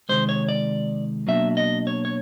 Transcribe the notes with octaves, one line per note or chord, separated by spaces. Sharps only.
C3 D#3 G#3 C5
C#5
D5
B2 F#3 A#3 D4 E5
D#5
C#5
C#5